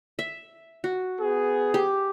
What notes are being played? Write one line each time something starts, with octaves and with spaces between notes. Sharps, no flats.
E5
F#4
B3 G#4
G4